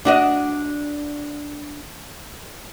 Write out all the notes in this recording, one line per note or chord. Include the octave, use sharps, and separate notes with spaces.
D4 F#4 D#5